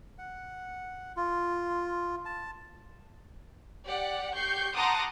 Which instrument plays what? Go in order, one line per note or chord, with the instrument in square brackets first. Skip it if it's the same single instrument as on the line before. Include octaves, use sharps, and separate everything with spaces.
[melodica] F#5
F4
A5
[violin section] G4 D5 F#5
G4 C#6 G6 C7
F#5 A5 A#5 C6 D6 D#6